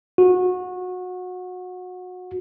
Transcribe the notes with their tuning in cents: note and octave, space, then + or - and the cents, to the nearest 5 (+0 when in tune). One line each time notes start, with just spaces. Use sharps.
F#4 -25